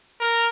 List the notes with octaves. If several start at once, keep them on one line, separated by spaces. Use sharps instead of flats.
A#4